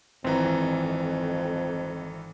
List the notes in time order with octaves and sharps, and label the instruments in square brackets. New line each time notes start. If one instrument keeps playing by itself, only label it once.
[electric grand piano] G#1 E3 A#5 [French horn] F2 [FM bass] C4